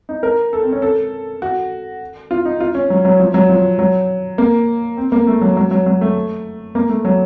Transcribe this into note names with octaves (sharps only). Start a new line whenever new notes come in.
D#4
A#4
A4
C4
C#4
A4
F#4
F4
D#4
F4
C#4
F#3
F#3
F3
F#3
F3
F#3
A#3
C4
A#3
A3
F#3
F#3
F#3
F#3
A3
A#3
A3
F#3